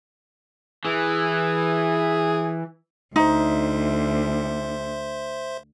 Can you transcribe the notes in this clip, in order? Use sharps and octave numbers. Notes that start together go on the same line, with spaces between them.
E3 G#4
D2 D#4 C5 E5 C6